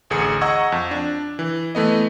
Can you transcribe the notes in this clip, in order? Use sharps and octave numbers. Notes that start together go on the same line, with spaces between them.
A1 D2 G#4 C#7
D#5 F#5 A#5 C#6 E6 G#6
F2
D4
E3
E3 A3 B3 D#5